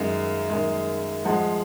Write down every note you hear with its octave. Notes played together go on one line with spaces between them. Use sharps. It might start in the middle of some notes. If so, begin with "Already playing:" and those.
Already playing: F#2 D#3 G#3 F5
F#2 D#3 G#3
G#2 F3 G#3 F#5